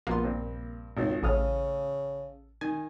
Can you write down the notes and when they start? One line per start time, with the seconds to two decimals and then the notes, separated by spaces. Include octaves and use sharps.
0.07 A#1 A#3 B3 F4 C6
0.23 G2 C4
0.97 G#1 C#2 D#3
1.23 A1 A2 C#3 A4 D#6 F6
2.61 D#3 G#5